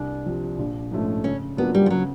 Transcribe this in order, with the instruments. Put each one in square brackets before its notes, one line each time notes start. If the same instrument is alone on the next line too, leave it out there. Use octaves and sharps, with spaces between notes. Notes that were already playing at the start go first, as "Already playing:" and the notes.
Already playing: [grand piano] C2 [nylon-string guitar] D4
[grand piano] C3 F3
A#1
G#2 F3 A3 C#4
[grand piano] C#3 [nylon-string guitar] C#4
[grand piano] F#3 A#3 D4 F4 [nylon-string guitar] B3
[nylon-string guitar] G3
F3
[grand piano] C#3 [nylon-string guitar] F#3